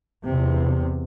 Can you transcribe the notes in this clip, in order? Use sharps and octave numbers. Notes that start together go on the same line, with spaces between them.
E2 C3